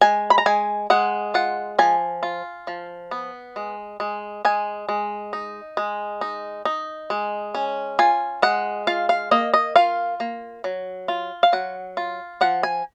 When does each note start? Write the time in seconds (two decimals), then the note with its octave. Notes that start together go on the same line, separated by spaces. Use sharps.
0.01 G#3 G#5
0.30 B5
0.38 A#5
0.46 G#3 G#5
0.90 G#3 F#5
1.34 F4 F#5
1.79 F3 G#5
2.23 F4
2.67 F3
3.11 B3
3.56 G#3
4.00 G#3
4.45 G#3 G#5
4.89 G#3
5.33 D#4
5.77 G#3
6.21 D#4
6.65 D#4
7.10 G#3
7.55 C#4
7.99 F4 G#5
8.42 G#3 F#5
8.87 F4 F5
9.09 F5
9.31 A#3 D#5
9.54 D#5
9.76 F4 F5
10.20 A#3
10.64 F#3
11.08 F4
11.43 F5
11.53 F#3 F#5
11.97 F4
12.41 F3 F#5
12.63 G#5